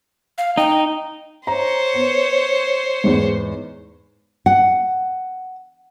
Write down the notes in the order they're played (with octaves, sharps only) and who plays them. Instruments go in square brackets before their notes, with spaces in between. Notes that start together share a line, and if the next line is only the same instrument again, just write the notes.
[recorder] F5
[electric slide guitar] D#4 [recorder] G5
[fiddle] C5 C#5 [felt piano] A#5
[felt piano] B3
E2 G#2
[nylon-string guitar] F#5